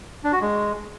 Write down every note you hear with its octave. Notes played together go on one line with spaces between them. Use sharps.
D4
F#4
G#3